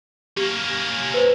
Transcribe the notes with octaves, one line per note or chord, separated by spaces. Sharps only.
A#3 C#4 G4
B4 C5